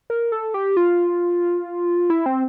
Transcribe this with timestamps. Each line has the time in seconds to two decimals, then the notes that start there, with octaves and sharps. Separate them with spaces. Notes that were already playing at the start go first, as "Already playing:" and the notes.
0.10 A#4
0.32 A4
0.54 G4
0.77 F4
2.10 E4
2.26 C4